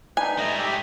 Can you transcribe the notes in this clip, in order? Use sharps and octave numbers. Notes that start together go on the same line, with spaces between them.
D4 D#4 B4 G#5
G#2 G3 A3 D#5 A#5
G4 E5